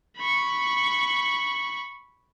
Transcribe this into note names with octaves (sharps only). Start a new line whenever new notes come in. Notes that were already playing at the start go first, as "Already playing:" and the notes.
B5 C#6